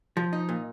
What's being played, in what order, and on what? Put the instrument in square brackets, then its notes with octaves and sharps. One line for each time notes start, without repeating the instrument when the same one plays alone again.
[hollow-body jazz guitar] F3
D#4
A#2